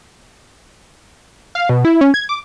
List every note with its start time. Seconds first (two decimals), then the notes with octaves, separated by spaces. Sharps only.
1.55 F5
1.69 B2
1.85 E4
2.01 C#4
2.14 G#6
2.29 D6